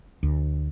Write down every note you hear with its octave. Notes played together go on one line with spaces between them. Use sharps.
D2